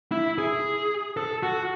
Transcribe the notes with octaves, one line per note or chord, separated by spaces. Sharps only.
E4
G#4
A4
F#4